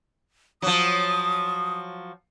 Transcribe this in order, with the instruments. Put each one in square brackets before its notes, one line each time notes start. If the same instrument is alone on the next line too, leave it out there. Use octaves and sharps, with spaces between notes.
[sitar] F3 F#3 [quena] D#6